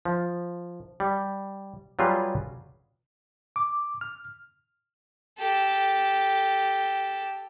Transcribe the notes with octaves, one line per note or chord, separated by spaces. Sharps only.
F3
G3
F#3 G3 F4 G#4 B4
D6
F6
G4 A4